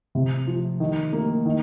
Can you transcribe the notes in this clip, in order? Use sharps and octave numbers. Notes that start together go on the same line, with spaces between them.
C3
F3
D#3
A#3
D#3